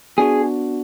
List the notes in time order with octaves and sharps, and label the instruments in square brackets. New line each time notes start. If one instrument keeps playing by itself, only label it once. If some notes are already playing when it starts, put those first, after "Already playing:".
[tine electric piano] B3 D4 F#4 [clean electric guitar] G#4